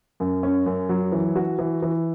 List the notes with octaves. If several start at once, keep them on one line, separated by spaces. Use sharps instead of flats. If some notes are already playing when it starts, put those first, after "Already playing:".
F#2
C#4
F#2
F#3
E3
F#4
E3
E3